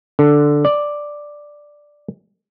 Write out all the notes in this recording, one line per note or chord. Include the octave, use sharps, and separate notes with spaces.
D3
D5